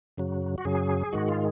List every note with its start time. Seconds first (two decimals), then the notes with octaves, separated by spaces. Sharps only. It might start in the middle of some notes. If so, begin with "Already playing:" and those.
0.17 F#2 C#3 F#3
0.58 F#4
0.65 F#2 C#3 F#3 G#4
1.12 G#2 D#3 G#3 F#4
1.28 F4